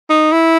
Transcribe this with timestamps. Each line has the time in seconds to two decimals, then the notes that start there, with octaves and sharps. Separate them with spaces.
0.09 D#4
0.32 E4